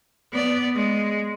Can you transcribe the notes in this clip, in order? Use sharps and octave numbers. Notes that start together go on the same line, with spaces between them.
B3 D5
G#3